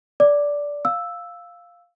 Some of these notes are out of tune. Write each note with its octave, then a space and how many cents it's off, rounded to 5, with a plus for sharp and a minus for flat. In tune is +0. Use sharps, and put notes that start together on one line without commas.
D5 -15 D6 +5
F5 +0 E6 +0